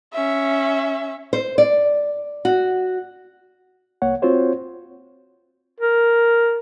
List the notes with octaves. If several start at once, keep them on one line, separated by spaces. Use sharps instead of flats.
C#4 E5
C5
D5
F#4
C2 A#3 C#5 F#5
C4 F4 F#4 C5 C#5
A#4